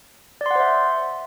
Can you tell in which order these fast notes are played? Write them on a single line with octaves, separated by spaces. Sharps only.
D5 C6 F#5 C5 E5